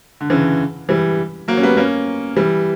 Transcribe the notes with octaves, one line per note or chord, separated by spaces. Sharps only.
D3
C#3 E3
E3 G3
F#3 A#3
C#4
G3 B3
A#3 C#4
E3 G3